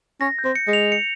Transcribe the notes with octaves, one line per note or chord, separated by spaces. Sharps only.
C#4 A#6
G6
C4
C#7
G#3
F7
C#7